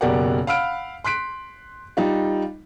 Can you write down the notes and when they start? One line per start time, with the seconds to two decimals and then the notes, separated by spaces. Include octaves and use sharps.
0.01 F#1 B2 G4 A#4 D5 F#5
0.47 F5 F#5 B5 E6 F6 D7
1.04 C6 F#6 B6 D7
1.97 G3 D#4 F4